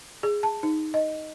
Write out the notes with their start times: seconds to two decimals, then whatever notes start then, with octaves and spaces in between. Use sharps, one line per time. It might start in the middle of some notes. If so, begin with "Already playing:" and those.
0.23 G#4
0.43 A5
0.63 D#4
0.94 D#5